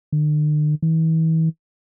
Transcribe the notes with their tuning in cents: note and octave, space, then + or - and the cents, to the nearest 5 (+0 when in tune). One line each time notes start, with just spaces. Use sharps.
D3 +45
E3 -40